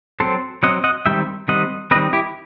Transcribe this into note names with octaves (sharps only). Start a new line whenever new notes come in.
F#3 C4 A4 C5
F#3 C4 D#5 F#5
D#5 F#5
D#3 G3 C4 E5 G5
D#3 G3 C4 D#5 F#5
D#3 G3 C4 B4 D#5
E4 G4